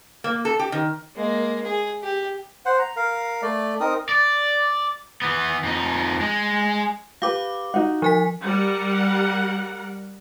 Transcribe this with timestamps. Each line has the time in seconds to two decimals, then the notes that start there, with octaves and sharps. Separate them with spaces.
0.24 A#3
0.45 A4
0.59 G4
0.72 D#3
1.16 G#3 A#3
1.65 G#4
2.03 G4
2.66 C5 F#5
2.79 A#5
2.96 A#4 F5
3.42 A3 D5
3.80 C4 D#4 A#4 D#6
4.09 D5
5.22 E3 B3
5.64 F2 D#4
6.21 G#3
7.22 G4 B4 F5 D6
7.74 D#4 F#4 F#5
8.02 F3 G#5 B6
8.44 G3 A#4 F#5